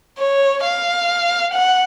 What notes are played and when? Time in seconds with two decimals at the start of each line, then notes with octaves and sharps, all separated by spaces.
0.18 C#5
0.64 F5
1.54 F#5